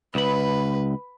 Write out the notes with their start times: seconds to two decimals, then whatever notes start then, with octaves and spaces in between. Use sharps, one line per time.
0.15 C#2 B4 B5